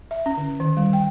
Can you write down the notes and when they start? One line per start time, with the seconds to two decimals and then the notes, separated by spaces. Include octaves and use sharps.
0.11 E5
0.26 C#4
0.37 D3
0.60 D#3
0.77 G3
0.93 G5